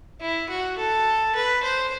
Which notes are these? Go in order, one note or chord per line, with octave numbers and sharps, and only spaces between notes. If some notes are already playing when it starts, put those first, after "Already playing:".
E4
F#4
A4
B4
C5